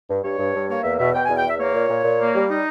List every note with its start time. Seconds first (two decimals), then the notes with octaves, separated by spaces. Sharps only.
0.09 G2
0.24 G2 C#5
0.39 G2
0.54 G2
0.69 A#3 C#5
0.84 E2 E5
0.99 B2 E5
1.14 B2 G5
1.25 E2 G#5
1.37 G5
1.44 E2 E5
1.59 A#3 C#5
1.74 A#2
1.89 A#2
2.04 A#2
2.20 A#3
2.34 G3
2.50 D#4